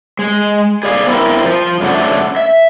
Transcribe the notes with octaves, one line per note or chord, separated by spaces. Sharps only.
G#3
G#4 D5 F5
B3 C4 E4 A#4
F3
F#2 C#3 A3 D4 F#5
E5